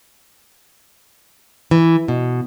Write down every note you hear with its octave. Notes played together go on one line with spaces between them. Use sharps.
E3
B2